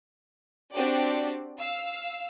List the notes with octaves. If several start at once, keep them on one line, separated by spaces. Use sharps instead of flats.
C4 D4 F#4 G4 D5
F5 E6